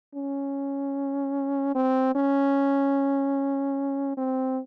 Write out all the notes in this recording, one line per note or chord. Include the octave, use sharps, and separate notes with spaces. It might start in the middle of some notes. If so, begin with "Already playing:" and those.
C#4
C4
C#4
C4